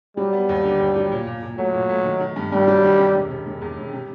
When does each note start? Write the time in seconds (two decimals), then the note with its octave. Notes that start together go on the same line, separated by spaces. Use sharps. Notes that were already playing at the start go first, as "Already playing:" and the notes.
0.17 F#3 G3
0.33 B3
0.49 D#2
0.65 D3
0.80 D#2
0.96 F#3
1.12 A#2
1.27 A#2
1.43 A#2
1.58 F#3 A3
1.74 A#2
1.89 A3
2.05 D#3
2.20 D#3
2.36 G2
2.52 G2 G3
2.68 F#3
2.83 D#3
2.99 C3
3.14 E1
3.30 C3
3.46 E1
3.61 E2
3.77 E1
3.93 C3